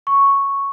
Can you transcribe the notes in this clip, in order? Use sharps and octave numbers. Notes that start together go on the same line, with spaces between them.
C#6